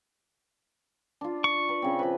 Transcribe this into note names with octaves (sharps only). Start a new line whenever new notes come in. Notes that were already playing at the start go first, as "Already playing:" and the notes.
D4 F4
C#6
B4
C#3 C4
F3 B4